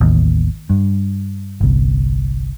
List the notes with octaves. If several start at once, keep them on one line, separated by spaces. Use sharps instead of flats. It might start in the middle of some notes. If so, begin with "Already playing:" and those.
A1 D#2
G2
G1 C2